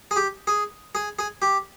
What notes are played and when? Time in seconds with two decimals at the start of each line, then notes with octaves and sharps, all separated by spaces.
0.11 G#4
0.16 G4
0.47 G#4
0.95 G#4
1.19 G#4
1.42 G4